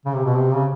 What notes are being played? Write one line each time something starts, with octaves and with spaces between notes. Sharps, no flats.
C#3
C3
B2
C3
C#3